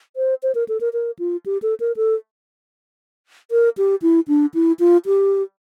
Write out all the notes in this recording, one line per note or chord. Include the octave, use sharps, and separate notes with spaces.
C5
C5
A#4
A4
A#4
A#4
F4
G4
A4
A#4
A4
A#4
G4
E4
D4
E4
F4
G4